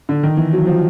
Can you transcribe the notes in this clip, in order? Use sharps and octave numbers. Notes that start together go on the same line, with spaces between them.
D3
D#3
E3
F#3
F3